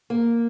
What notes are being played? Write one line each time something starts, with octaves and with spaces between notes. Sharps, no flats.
A#3